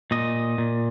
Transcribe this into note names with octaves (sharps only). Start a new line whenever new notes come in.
A#2 D#5
A#2